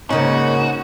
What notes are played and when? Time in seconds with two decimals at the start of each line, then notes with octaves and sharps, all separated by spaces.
0.10 G#2 C#3 A#3 C#4 D#4 F#4